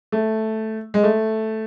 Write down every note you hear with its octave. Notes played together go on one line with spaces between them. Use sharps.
A3
G#3
A3